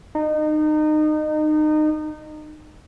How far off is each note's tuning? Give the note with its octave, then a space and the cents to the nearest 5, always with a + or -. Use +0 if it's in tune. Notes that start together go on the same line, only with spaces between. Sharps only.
D#4 -30